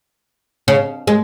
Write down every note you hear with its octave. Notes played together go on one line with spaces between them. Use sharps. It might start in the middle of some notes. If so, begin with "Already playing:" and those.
C#3
G#3